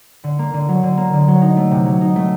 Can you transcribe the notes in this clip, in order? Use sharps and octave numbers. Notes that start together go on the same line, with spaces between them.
D3
A#3
D3
F#3
D3
A#3
D3
F#3
D#4
A3
C3
F#3
D#4
A3